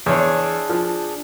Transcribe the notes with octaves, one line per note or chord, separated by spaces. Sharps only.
E2 D4 G#4 C#5
F3